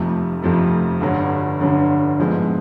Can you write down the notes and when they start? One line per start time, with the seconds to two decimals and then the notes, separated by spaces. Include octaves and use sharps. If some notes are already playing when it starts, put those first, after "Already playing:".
Already playing: F1 F2 C3 F3 A3
0.43 F1 F2 C3 F3 A3
1.01 G1 G2 D3 F#3
1.60 G1 G2 D3 F#3
2.19 A#1 G#2 F3 G#3 B3